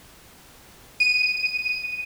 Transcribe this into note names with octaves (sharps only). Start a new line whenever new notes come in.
D#7